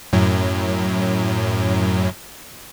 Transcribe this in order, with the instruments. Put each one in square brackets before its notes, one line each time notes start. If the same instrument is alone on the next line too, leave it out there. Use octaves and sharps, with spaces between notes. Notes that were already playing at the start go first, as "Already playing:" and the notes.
[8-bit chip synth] F#2 A2 F#3